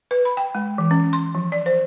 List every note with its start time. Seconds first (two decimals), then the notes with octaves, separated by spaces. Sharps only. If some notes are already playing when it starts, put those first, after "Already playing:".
0.11 B4
0.25 B5
0.37 G5
0.55 G#3
0.78 E3
0.91 C#4
1.13 C6
1.35 F3
1.52 D5
1.66 C5